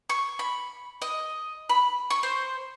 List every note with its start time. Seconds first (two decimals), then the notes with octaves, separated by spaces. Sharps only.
0.10 C#6
0.39 B5
1.02 D#5
1.69 B5
2.10 C#6
2.23 C5